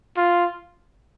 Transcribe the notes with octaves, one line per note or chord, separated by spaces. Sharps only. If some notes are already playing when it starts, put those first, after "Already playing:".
F4